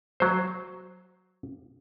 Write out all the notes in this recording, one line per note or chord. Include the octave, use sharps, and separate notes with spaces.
F#3 C5